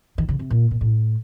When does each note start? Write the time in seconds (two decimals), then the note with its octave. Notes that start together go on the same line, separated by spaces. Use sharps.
0.18 D#3
0.29 C#3
0.39 C3
0.50 A#2
0.71 A#2
0.81 A2